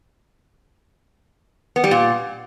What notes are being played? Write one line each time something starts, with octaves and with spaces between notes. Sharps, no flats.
B3
G3
A#2